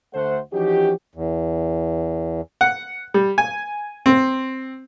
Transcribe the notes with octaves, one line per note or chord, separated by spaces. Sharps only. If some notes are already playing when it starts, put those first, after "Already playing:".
D2 A3 C5 F#5
E3 F3 C#4 D#4 F#4 G4
E2
F#5
G3
G#5
C4